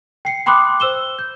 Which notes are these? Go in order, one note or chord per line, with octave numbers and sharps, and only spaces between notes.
G5 C7 C#7
G5 B5 C6 D6 D#6 F#6
C5 E6 E7 G7
G6